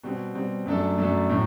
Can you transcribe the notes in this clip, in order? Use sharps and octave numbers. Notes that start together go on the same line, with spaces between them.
B2 G3 C4
B2 G3 C4
F#2 F#3 A3 D4 A4
F#2 F#3 A3 D4 A4
A2 F#3 A3